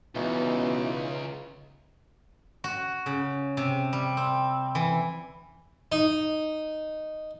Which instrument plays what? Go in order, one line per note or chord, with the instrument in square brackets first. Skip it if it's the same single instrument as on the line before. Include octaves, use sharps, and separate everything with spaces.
[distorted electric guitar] C#2 [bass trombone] B2 [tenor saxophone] E3 [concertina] C#4 D#4 F4
[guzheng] F#4
C#3
C3
G3
C4
E3
[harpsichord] D#4